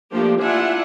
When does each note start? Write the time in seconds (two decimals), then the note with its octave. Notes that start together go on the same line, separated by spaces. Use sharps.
0.12 F3 A3 A#3 D4 G4
0.41 D4 E4 F4 E5 F#5 G#5